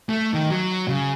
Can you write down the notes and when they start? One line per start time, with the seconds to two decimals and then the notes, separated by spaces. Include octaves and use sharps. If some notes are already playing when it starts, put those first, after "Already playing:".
0.09 A3
0.34 D#3
0.51 F#3
0.88 C#3